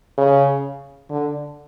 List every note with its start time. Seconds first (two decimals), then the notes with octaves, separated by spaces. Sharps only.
0.18 C#3
1.10 D3